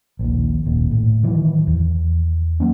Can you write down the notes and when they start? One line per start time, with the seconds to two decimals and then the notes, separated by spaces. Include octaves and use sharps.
0.19 A#1 D#2
0.66 D#1 A#2
0.91 A2
1.23 D#3 E3 F#3
1.67 E2
2.60 F#3 G#3 A#3 C#4